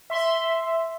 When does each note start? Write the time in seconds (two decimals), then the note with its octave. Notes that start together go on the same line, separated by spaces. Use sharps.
0.10 E5 C6